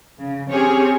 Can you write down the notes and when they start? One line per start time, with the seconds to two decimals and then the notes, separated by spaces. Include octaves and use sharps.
0.18 C#3
0.50 C4 C#4 G4 G#4 C#5 G#5